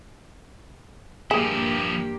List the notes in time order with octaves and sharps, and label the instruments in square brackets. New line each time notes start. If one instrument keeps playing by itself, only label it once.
[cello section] G2 A#3 G4 [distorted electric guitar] F3 E4 [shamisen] G#4